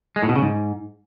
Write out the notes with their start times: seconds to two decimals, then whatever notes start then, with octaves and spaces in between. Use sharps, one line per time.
0.16 G#3
0.23 A2
0.29 B2
0.35 C#3
0.42 G#2